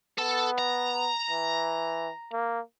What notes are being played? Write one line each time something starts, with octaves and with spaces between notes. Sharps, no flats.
B3 A4 A5
A#5
E3
A#3